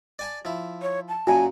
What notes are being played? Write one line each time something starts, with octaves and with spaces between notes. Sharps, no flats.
D5 G#5 A5
F3 E4
C#5
A5
F#2 A#2 F#4 G#5